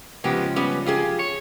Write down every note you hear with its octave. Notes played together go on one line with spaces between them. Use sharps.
C#3 F3 G#3 B3 G4
G3 B3 C#4
F4 G4 G#4
C#5